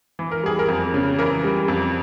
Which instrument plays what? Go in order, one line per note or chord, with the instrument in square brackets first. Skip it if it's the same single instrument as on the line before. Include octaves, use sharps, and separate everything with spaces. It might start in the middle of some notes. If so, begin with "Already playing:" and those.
[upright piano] E3
A#4
G3 G#4
A#4
F2
C#3
E3 A#4
G3
F2